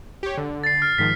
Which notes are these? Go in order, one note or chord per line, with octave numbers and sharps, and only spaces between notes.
G4 C#5
D3
A6 C7
F6
G#2 D#3 F3 B6